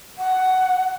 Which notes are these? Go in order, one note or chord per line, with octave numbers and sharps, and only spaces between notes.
F#5